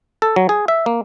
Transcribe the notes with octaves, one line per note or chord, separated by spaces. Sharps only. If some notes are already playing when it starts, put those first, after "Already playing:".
A4
F#3
G#4
E5
A#3